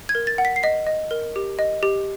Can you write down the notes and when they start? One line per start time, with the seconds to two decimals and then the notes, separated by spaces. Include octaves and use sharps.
0.09 G#6
0.15 A#4
0.27 A6
0.38 F#5
0.45 B6
0.56 C7
0.63 D#5 B6
0.87 D#5
1.11 A#4
1.36 G4
1.59 D#5
1.83 G4